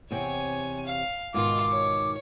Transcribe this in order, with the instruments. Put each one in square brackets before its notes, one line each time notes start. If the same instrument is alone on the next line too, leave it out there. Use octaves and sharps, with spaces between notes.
[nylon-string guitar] E2 C3 C4 [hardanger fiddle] C#5 G#5
[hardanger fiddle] F5
[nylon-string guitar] G#2 B2 D#3 [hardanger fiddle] F4 [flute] D6
[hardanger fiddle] C#5